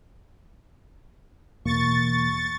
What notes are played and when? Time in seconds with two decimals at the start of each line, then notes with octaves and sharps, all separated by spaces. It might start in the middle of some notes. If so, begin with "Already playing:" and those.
1.65 E2 B2 A#3 C#6 A6